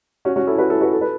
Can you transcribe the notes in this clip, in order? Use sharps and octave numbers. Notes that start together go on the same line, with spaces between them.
C#4 F#4
C#4 F#4
E4 A4
F#4 B4
E4 A4
F#4 B4
A4
B4